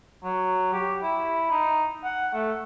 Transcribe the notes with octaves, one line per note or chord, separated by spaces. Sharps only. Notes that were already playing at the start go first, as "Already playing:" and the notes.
F#3
G4
E4
D#4
F#5
A3